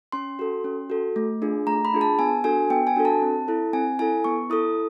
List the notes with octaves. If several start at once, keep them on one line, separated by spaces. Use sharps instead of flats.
C#4 C6
F#4 A4
C#4
F#4 A4
A3
D4 F4 G#4
A3 A#5
B5
D4 F4 G#4
A5
B3 G#5
D4 F#4 A4 G#5
B3 G5
G#5
D4 F#4 A4
A5
C4
E4 A4
C4 G#5
E4 A4 G#5
B3 C#6
E4 A4 D#6